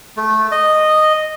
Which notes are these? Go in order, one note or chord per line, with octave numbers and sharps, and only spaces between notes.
A3
D#5